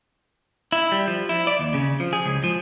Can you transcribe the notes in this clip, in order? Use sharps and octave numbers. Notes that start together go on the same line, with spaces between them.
E4
G3
F3
E4
D5
D#2
C#3
F3
G#4
C#2
F3